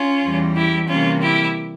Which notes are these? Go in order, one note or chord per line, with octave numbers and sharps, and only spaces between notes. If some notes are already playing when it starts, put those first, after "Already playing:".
Already playing: C#4 F4
E2 E3 G3
E4 G4
C3 E3 G3 A#3 C#4 F4
E4 G4